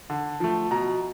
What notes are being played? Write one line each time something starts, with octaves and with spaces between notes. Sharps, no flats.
D3
F3 A3
B2 A#5